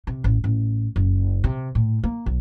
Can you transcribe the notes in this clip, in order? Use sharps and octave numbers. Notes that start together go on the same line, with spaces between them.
C3
A1
A1
F#1
C3
A2
A#3
B1